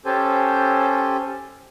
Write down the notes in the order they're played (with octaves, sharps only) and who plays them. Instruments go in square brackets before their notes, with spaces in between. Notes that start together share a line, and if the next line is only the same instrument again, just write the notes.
[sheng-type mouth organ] C#4 G4 A4 C5 G#5